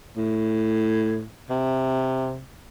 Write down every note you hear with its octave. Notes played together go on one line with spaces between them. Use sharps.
A2
C3